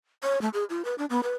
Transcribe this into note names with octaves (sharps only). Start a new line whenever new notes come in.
C#5
A3
G#4
F4
B4
D4
B3
B4